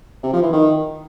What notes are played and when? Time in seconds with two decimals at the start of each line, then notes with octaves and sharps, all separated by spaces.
0.23 C3
0.33 F3
0.43 E3
0.53 D#3